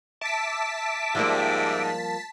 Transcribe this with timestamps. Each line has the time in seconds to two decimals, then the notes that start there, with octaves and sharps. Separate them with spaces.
0.21 E5 A5 D6 B6
1.15 G#2 F3 G3 A#3